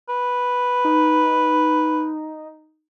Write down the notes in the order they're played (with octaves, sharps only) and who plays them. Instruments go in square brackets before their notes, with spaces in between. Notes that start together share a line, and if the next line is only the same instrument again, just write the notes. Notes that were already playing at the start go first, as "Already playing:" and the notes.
[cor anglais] B4
[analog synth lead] D#4